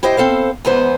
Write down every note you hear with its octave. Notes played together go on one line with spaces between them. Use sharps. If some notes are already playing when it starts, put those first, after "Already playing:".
E4 G4 C5 D#5 E5
C4 A4 C5 F5
E2 G#2 E3 B3 B4 C5